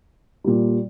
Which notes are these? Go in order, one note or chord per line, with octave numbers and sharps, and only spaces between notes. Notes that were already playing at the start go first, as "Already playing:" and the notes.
A#2 G3